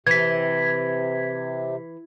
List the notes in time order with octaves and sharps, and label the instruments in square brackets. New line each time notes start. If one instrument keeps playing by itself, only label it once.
[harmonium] C3 [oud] E3 [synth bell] G#6 B6